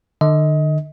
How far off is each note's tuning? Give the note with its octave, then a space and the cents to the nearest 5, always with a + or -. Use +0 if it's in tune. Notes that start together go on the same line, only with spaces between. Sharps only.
D3 +45 D#5 +25